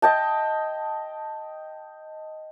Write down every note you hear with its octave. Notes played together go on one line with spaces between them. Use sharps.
D#5 G5 A5